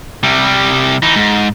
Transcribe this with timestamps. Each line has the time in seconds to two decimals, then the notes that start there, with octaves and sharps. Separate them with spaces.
0.23 C3 G3
1.02 E3 D#4
1.16 G#2